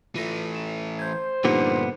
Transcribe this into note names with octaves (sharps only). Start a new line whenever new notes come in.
E3 A3 F4 A#6
E7
C5 G6 G#6
G2 A#2 D3 F3 B3 D#4 G4